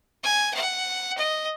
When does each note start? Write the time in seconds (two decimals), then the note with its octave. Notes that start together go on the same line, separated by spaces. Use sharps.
0.23 G#5
0.54 F#5
1.18 D#5